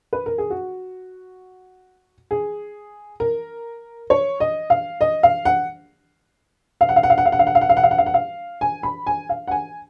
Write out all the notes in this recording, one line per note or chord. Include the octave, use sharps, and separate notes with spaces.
B4
A#4
G#4
F#4
G#4
A#4
C#5
D#5
F5
D#5
F5
F#5
F5
F#5
F5
F#5
F5
F#5
F5
F#5
F5
F#5
F5
F#5
F5
F#5
F5
F#5
F5
F#5
F5
G#5
B5
G#5
F5
F#5
G#5